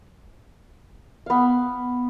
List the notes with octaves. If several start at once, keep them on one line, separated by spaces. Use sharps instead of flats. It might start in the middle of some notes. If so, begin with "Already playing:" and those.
B3 F5